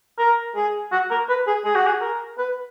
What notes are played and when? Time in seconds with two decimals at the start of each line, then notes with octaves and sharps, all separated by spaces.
0.19 A#4
0.56 G#4
0.92 F#4
1.10 A#4
1.29 B4
1.47 G#4
1.65 G#4
1.75 F#4
1.86 G#4
2.01 A#4
2.38 B4